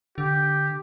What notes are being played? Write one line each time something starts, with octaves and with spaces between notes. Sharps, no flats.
D3 G4